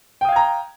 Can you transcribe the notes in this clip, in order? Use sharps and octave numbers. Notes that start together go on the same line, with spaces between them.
F5 G5 A#5 D#6 G#6